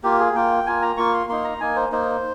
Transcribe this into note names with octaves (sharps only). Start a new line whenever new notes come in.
A#3 F4 G4
G#4
A#3 F4 G5
A#3 F4 G#5
A#5
A#3 F4 C#6
C6
A#3 D#4 C6
A#5
A#3 D#4 G#5
C5
A#3 D#4 C5